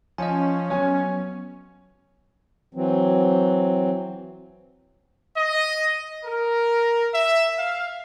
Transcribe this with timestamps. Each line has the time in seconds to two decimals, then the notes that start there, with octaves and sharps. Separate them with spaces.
0.18 F3 C#4 D#5 G#5
0.70 F#3 B3 C#5 G#5
2.74 E3 F#3 C4
5.37 D#5
6.25 A#4
7.14 E5
7.59 F5